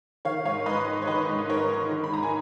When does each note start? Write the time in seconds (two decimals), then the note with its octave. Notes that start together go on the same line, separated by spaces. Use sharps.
0.25 D#3 C#5 F5
0.45 G#2 C#5 F5
0.66 G#2 B4 D#5
0.88 D#3
1.02 C#5
1.07 D#3 B4 D#5
1.29 G#2
1.49 G#2 A#4 C#5
1.70 D#3
1.91 D#3
2.04 B5
2.12 G#2 A#5
2.23 G#5